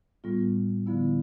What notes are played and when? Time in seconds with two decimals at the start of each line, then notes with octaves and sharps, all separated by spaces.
0.24 A2 G3 B3 F4
0.86 D3 F3 B3 E4